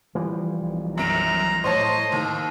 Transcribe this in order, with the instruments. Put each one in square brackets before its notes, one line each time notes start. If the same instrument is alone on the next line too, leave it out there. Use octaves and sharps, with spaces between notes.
[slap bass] E3 F3 G3
[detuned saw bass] B1
[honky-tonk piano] F#2 D7 [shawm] A#5
[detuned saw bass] A2 [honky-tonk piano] C5 C#5 A5 [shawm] D#5
[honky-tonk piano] D#2